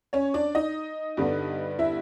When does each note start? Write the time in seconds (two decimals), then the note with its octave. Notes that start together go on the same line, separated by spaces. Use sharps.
0.13 C#4 C#5
0.34 D4 D5
0.55 D#4 D#5
1.17 G2 D3 G3 B3
1.79 E4 E5